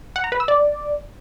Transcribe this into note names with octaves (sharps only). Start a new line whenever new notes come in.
F#5
A#5
B4
E6
D5